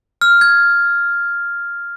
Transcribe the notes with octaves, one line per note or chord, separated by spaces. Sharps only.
F6
G#6